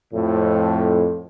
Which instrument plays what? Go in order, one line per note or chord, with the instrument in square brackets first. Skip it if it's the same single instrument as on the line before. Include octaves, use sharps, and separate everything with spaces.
[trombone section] F2 A2